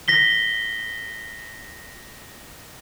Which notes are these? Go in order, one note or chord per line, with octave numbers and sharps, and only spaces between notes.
A#6 B6 G7